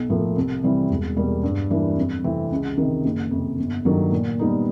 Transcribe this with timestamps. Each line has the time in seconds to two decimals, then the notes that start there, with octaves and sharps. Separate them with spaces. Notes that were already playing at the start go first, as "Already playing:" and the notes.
Already playing: B1
0.09 A2 F3 A#3
0.36 C2
0.63 C3 E3 G3 C4
0.90 E1
1.16 E2 B2 G3 A#3
1.43 G2
1.70 E3 G3 A#3 D4
1.97 F2
2.24 C3 E3 A3 C4
2.51 C#2
2.78 C3 D#3
3.05 F#1
3.31 F2 C3
3.59 G1
3.85 G2 D#3 F#3 A3
4.12 A#2
4.39 G3 B3 D#4